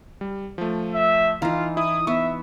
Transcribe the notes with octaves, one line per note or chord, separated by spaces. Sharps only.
G3
F3 A3
E5
E3 D#4 F4 F5 A#5
E4 D#6
B3 E5 C#6